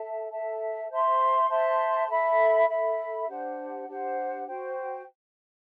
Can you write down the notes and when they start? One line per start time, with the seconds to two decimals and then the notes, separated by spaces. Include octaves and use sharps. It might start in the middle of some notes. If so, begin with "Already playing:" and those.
Already playing: A4 E5 A5
0.30 A4 E5 A5
0.89 C5 E5 A5 C6
1.49 C5 E5 A5 C6
2.08 A4 E5 B5
2.68 A4 E5 B5
3.28 D4 G4 C5 F#5
3.87 D4 G4 C5 F#5
4.46 F#4 C5 G5